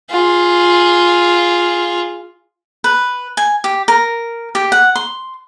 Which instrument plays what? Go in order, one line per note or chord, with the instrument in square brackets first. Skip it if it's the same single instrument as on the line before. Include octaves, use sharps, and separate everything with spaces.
[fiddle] F4 G#4
[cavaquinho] B4
G#5
G4
A#4
G4
F#5
C6